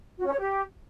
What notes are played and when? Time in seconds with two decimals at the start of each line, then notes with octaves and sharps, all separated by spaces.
0.18 F#4
0.25 C#4
0.31 C#5
0.38 G4